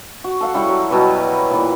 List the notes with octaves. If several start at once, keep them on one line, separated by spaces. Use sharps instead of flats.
F#4
A4 F5 F#5
G3 E4 C#5 C#6
F#3
B2 F#3 G3 B4
A#2 E3